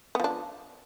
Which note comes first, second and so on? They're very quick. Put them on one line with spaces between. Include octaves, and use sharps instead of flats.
B3 F3 D4